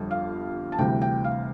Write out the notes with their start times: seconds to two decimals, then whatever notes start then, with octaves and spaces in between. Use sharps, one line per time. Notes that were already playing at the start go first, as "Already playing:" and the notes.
Already playing: G1 F2 D3 G3
0.11 F5
0.72 A5
0.78 D2 C3 E3 G3 G5
1.02 G5
1.24 F5